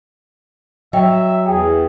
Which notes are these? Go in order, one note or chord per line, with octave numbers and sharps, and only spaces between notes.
F#3 D#5 E5 G5
E2 G#4 G5